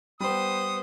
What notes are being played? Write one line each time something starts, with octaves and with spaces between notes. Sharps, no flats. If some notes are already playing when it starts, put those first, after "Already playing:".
G3 B3 C5 D#6